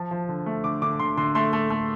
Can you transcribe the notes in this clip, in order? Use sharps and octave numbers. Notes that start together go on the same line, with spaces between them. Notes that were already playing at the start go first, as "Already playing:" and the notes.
Already playing: F3 A5
F3
D3
A3
D3 D6
D3 D6
D3 C6
D3 C6
A3 C6
A3
A3